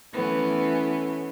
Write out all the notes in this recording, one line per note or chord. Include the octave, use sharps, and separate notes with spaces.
E3 A3 B3 C#4